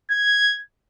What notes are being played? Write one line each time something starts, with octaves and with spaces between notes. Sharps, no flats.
G#6